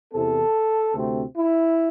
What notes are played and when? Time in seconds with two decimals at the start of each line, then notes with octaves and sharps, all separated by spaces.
0.12 E2 C3 E3 C4 A4
0.94 D2 C3 A3 C4
1.36 E4